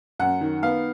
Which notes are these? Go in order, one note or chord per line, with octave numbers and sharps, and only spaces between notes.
F#2 F#5
D#3
B3 F5